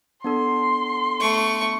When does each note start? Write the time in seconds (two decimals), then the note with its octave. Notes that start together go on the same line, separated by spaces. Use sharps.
0.24 B3 D4 A4 C6
1.21 A3 C#6